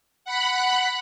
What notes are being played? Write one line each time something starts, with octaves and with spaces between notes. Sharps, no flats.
F#5 B5 F#6